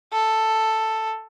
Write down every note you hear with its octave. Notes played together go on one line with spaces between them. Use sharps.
A4